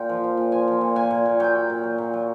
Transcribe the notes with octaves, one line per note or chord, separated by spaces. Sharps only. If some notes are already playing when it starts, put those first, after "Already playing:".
Already playing: A#2 G5
F3
F3
A#2
F3 G#5
F3
A#2
A#2 G#5
A#2
A#2
F#3 G5
F#3
A#2
F#3
A#2
F#3